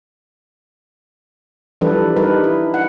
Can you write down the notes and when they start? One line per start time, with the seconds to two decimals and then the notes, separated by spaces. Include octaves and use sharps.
1.81 E3 F3 G3 D4 A4 B4
2.16 G3 D4 D#4 A#4 B4
2.44 E4
2.74 F#5